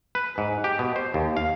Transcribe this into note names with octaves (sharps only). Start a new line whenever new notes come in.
B4
G#2
G4
B2
C5
D#2
F5